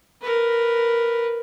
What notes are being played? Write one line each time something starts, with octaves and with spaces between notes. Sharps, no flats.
A#4 B4